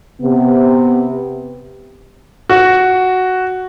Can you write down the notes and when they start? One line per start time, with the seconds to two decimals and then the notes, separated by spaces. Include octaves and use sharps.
0.20 C3 B3
2.50 F#4